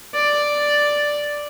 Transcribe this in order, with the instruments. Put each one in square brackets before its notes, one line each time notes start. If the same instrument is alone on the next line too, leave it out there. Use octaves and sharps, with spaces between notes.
[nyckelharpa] D5